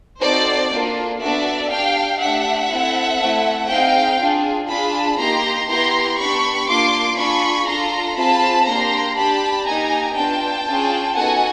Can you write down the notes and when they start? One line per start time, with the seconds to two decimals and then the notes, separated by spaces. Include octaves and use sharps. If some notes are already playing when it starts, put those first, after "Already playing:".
0.21 C4 D#4 F#4 A4 C5 D5
0.72 A#3 D4 F4 A4
1.21 B3 D4 F#4 A4 D5 E5
1.71 D4 G4 F5 G5
2.20 A3 D4 G4 E5 F#5
2.71 C4 E4 A4
3.19 A3 C4 E4 A4
3.69 C4 D#4 G#4 F5 G5
4.19 D4 F4 G#4
4.69 D4 F4 G#4 A5 B5
5.18 A#3 D#4 G4 A#5 C6
5.68 B3 E4 G4 A#5 C6
6.17 B3 D4 G4 B5 C#6
6.67 A#3 D4 F4 C6 D6
7.17 D4 F4 G#4 B5 C#6
7.66 D4 F4 A4 A#5 C6
8.16 C4 F4 G#4 A5 B5
8.66 A#3 D4 G4 A#5 C6
9.16 D4 G4 A5 B5
9.66 A#3 D#4 G4 G#5 A#5
10.15 B3 D4 F4 G5 A5
10.65 C#4 F4 G#4
11.15 B3 D#4 F#4 A4 F#5 G#5